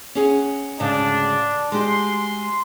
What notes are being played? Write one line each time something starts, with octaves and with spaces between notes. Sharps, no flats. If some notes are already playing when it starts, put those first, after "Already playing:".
C#4 G#4 F#5
D2 G#2 C#3 D4
G#3 F#4 G4 C6